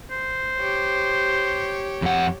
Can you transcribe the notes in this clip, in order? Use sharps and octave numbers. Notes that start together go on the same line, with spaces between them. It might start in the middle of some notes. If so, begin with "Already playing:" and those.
C5
G4 C#5
F2 F#5